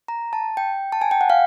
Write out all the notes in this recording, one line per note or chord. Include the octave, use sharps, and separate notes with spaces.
A#5
A5
G5
A5
G#5
G5
F#5
F5